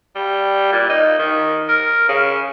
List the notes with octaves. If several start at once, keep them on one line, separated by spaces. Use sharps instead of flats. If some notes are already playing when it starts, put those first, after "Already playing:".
G3
A#2
D#4
D#3
A#4
C#3